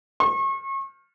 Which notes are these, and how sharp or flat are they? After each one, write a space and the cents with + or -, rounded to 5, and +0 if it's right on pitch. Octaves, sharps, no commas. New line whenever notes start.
C#6 -35